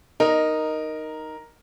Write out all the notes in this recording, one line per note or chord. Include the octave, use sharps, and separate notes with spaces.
D#4 A#4